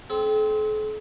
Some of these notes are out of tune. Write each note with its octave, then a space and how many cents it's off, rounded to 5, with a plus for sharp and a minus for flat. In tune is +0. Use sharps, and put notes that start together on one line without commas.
C4 +0 A4 -45